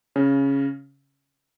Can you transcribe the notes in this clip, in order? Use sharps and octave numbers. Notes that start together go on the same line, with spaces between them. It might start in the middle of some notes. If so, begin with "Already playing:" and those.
C#3 C#4